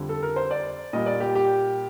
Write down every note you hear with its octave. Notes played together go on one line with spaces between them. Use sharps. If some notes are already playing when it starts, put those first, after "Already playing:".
Already playing: F2 D3 G3
A4
A#4
C5
D5
A#2 G3 D#5
D5
G4
G4